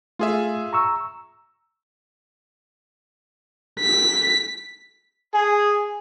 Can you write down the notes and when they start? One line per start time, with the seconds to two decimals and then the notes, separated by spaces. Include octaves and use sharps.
0.19 A3 F4 G#4 E5
0.73 A#5 C#6 E6
3.80 B6
5.35 G#4